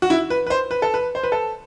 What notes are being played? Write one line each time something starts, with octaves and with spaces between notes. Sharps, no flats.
F#4
E4
B4
B4
C5
B4
A4
B4
C5
B4
A4